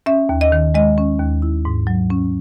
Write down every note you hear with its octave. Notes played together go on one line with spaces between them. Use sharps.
C#4 E5
D#2
D#5
D#3
G#3 D#5
C#4
D#2
E4
G#2
F#3
C#4